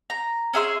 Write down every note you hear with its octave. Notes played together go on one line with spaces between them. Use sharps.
A#5
C#4 G#4 E5 C6